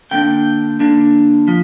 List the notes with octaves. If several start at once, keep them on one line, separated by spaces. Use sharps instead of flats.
D3 A#3 D4 G5
D3 A#3 D4
F3